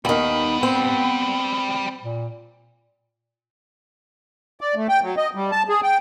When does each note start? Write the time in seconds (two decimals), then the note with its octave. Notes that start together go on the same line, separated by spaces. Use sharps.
0.05 D#2 D#3 G3 B3 B4
0.63 C4
2.03 A#2
4.61 D5
4.75 A3
4.89 G5
5.03 F#3
5.17 D#5
5.35 G3
5.52 A5
5.69 G#4
5.83 G5